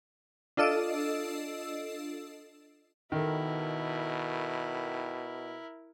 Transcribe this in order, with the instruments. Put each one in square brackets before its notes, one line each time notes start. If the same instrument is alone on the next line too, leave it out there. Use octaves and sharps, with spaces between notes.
[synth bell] D4 F4 A4 D#5 E6 D7
[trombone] B2 [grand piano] D#3 A4 [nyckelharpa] E4 A#4